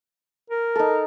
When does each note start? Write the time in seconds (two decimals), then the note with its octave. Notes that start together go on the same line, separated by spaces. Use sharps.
0.50 A#4
0.75 D#4 A4